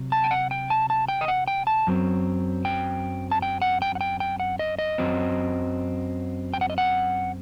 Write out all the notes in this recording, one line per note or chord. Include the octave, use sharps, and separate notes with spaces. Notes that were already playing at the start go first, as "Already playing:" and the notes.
Already playing: C3 F#3
A5
G5
F#5
G5
A5
A5
G5
D#5
F#5
G5
A5
F#2 F#3 C4
G5
A5
G5
F#5
G5
F#5
G5
G5
F#5
D#5
D#5
F#2 F#3 C4
G5
F#5
D#5
F#5